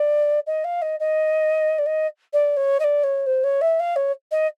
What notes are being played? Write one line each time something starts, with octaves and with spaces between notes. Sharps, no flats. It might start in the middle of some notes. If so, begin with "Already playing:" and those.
Already playing: D5
D#5
F5
D#5
D#5
D5
D#5
D5
C#5
D#5
D5
C#5
C5
C#5
E5
F5
C#5
D#5